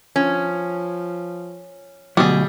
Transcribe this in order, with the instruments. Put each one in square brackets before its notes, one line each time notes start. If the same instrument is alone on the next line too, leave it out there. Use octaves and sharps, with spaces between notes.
[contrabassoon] F3 [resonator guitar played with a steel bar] C#4
[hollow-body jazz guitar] D2 B2 F#3 [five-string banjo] G3 G#4